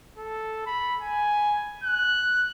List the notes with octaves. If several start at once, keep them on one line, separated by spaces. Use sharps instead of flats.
A4
B5
G#5
F#6